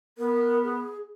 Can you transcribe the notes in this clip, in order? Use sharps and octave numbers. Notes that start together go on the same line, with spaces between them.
B3 A#4
G#4